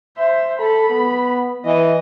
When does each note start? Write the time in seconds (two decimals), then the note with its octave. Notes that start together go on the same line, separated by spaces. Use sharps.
0.17 C5 E5
0.59 A4 B5
0.90 B3
1.65 E3 D#5